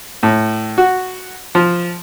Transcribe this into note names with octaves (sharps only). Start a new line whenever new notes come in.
A2
F#4
F3